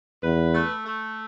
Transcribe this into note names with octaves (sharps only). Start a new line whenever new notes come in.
E2 B4
A3
A3